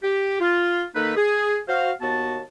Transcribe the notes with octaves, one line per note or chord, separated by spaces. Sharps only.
G4
F4
D#3 A#3 D#4 A4 B4
G#4
F#4 C5 F5
D#2 B3 F#4 A5